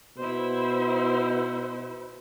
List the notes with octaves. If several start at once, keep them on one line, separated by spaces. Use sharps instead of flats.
B2 E4 C5